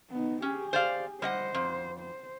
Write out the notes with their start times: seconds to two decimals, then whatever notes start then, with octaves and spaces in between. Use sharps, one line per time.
0.10 B3 D#4
0.42 C#4 G4 G#4
0.73 C5 D5 F5
1.22 G3 C5 D#5 F#5
1.54 F2
1.99 C5